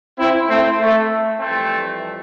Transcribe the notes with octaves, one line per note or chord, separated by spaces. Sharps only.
C4 E4
A3 C4
A3
F2 E3 G3 A3 C4